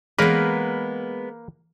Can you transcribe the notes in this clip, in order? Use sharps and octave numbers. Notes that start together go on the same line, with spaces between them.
E3 G#3 A#3 B3 A#4 B4